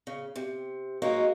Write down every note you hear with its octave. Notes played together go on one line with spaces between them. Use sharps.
C#3
C3
F#3 G#3 A#3 C#4 D#4 F#4